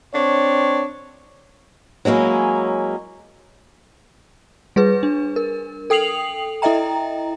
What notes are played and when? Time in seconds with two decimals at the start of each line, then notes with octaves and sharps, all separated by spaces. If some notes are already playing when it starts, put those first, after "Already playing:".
0.15 C4 D4 C#5
2.05 F#3 G#3 A#3 C#4 E4
4.76 G3 G#4 B4
5.03 D4
5.36 A#4
5.90 A4 G5 D#6 C7 F7 F#7
6.62 E4 A4 D#5 E5 G5 A#5